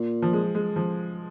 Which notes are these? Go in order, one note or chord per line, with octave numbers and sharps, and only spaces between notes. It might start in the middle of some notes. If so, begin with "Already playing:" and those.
Already playing: A#2
F3
G#3
G#3
F3